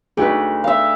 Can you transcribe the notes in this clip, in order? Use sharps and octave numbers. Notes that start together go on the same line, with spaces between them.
D2 D#4 F#4 G#4 B4
E5 F5